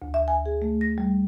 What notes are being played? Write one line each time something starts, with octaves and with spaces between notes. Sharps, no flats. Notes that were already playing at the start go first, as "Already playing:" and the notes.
D2
E5
G#5
G#4
A3
A#6
G3